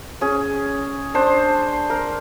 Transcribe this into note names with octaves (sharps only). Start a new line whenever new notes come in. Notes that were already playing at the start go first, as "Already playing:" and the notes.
C#4 G#4
D4 C5
A#4